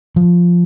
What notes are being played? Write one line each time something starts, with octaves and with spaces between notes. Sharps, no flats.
F3